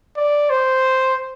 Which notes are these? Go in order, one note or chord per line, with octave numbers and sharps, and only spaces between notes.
D5
C5